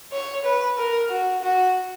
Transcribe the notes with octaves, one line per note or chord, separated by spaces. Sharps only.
C#5
B4
A#4
F#4
F#4